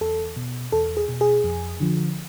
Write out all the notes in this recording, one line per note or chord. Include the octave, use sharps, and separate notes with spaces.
E2 A4
B2
E2 A4
G#4
B2
G#4
F2
D3 F3